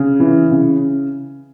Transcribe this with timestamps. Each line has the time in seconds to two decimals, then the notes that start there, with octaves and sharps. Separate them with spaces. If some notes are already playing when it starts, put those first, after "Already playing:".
Already playing: C#3
0.20 E3
0.51 C#3